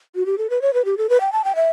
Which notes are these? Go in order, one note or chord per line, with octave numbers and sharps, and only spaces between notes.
F#4
G4
A4
B4
C#5
B4
G4
A4
B4
G5
A5
G5
E5